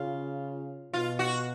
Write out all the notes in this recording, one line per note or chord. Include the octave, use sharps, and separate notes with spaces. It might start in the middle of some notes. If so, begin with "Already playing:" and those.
Already playing: C#3 F4
B2 F4
F#4